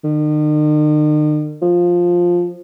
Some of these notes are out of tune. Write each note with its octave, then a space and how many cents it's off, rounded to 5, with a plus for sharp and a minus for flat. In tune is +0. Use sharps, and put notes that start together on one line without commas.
D#3 -45
F3 +5